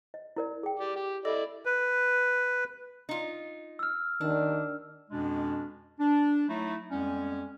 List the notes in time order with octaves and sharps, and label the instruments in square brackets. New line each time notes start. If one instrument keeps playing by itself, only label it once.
[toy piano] D#5
E4 A#4 D5
G#4 G5
[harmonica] G4 D5 D6
G4
[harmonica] E4 D5 [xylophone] A4 D#5
[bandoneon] B4
[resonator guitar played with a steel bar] D#4 F4
[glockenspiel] E6 F6
[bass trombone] D#3 [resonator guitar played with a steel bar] D4
[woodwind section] F2 B2 G#3 C#4 D4
D4
F#3 A3 D#4 E4
F2 G3 G#3 B3 C#4